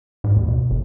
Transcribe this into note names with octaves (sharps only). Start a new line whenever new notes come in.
G#2
D#2
B2
G1